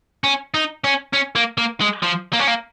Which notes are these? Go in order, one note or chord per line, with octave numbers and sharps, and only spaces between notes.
C#4
D#4
C#4
C#4
A#3
A#3
G#3
F3
A#3
C#4
A#3